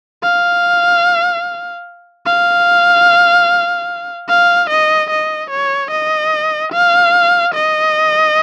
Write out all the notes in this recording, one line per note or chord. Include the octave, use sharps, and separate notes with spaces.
F5
F5
F5
D#5
D#5
C#5
D#5
F5
D#5